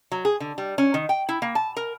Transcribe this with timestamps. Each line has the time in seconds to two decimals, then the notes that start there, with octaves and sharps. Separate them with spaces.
0.12 F#3
0.25 G#4
0.40 D3
0.58 G3
0.78 C#4
0.94 D#3
1.09 G5
1.29 E4
1.42 A#3
1.55 A5
1.77 A#4